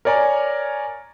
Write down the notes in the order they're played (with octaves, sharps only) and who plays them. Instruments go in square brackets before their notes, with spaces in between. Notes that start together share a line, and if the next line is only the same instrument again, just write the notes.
[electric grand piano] A#4 C#5 D5 G#5 A#5